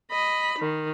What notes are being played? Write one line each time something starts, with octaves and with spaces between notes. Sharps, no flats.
D#5 B5
D#3